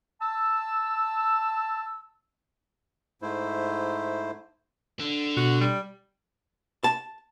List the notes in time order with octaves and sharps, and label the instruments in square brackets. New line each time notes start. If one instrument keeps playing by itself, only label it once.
[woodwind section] A5 E6
[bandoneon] G#2 A3 E4 C5
[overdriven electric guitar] D3
[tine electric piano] B2 [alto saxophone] F#4
[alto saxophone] G3
[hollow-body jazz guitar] A5